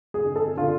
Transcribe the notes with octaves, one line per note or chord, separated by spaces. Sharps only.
G#4
D3
A4
D3 F4